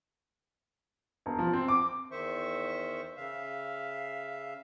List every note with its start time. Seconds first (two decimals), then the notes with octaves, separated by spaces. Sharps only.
1.26 E1
1.39 F3
1.53 C4
1.68 D6
2.11 E2 D#3 C5 E5 C#6
3.17 C#3 E5 F5